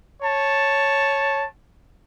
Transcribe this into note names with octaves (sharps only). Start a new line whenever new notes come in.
C#5 A5